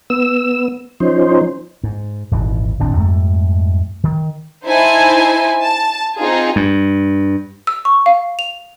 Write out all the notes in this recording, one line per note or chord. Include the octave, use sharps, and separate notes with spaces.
B3 E6
F3 C#4 D#4 C5
G#2
D#1 G#1 E3
D1 G1 C4 D4
F2 G#2 G3 A3
D#3
D#4 E4 C5 G#5 A5
A5
C4 D#4 F4 G#4
G2
E6
C#6
F5
F7